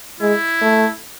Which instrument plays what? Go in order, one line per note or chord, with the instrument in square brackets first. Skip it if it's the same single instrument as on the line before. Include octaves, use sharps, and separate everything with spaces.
[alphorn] G#3 [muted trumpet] E4
[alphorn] A3